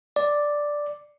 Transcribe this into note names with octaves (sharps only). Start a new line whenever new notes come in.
D5